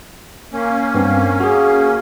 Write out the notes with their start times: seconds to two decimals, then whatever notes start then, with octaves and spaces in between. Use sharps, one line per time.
0.53 A#3 C#4
0.95 G2 B3 C4
1.40 F#4 G#4